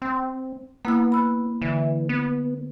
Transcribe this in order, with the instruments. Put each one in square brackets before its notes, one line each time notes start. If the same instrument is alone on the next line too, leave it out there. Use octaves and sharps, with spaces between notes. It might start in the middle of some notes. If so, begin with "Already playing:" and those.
[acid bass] C4
[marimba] A#3 E4 E6 [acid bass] B3
[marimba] B5 E6 F#6
[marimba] D3 [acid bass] E3
[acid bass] B3